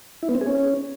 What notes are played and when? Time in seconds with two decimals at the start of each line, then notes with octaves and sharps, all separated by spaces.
0.23 E4
0.29 B3
0.35 C4
0.41 G#4
0.47 C#4